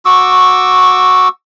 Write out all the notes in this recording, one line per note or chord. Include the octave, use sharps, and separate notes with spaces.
F#4 C#6 D6 E6